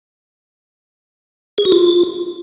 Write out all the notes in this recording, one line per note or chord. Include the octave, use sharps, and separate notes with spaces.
G#4
F#4
F4